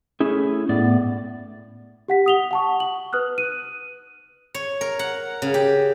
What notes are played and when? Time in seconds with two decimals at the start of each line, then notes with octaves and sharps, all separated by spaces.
0.20 A3 C#4 E4 G#4
0.69 A2 B3 D5
2.08 G4 F#5 B6
2.26 D#6 F7 G7
2.51 F#5 A5 C#6
2.80 F#7
3.13 B4 D#6 F6 F#6
3.38 D#7
4.55 C#5
4.81 A#4
4.99 F#5
5.42 C#3
5.54 G4